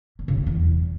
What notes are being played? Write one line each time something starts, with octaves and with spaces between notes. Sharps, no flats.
D3
C#3
D3
E2